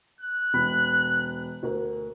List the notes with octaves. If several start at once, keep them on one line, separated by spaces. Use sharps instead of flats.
F#6
E1 B5 B6
D2 A#4